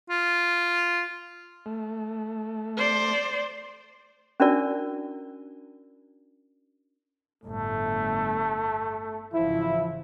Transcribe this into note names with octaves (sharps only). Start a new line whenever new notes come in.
F4
A3
C5 D5
C#4 D4 E4 F#4 A#4 D5
G1 A2 A3
G#1 C#3 E3 F3 E4